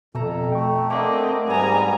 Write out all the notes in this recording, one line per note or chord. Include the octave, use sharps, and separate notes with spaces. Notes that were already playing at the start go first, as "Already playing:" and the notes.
F2 B2 A4 E5 A#5
A3 G5 C#6
A#3 C4 D4 A#4 D#5 E5 F#5
G#2 G3 B3 G#4 G#5 A#5